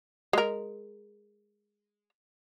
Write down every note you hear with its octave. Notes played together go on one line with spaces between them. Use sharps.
G#3 A#4